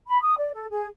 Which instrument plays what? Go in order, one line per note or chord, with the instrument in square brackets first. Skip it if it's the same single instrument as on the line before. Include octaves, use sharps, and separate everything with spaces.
[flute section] B5
D#6
D5
A4
G#4